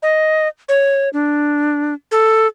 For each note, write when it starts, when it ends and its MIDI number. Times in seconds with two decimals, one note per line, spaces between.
0.03 0.48 75
0.69 1.09 73
1.13 1.94 62
2.11 2.47 69